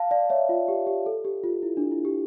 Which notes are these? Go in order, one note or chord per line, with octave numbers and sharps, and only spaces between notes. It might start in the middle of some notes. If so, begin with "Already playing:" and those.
Already playing: F5 A5
D5 F5
C#5 E5
F4
G4
G4
A4
G4
F4
E4
D4
E4
G4